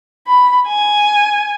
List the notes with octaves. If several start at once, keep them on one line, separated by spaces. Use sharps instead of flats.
B5
G#5